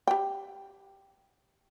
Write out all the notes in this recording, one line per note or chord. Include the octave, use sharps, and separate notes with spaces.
G4 G5